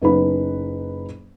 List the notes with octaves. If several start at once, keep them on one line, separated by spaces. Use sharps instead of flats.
F#1 B3 D#4 B4 B5